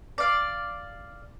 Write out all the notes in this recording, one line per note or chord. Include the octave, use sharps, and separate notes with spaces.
D5 F5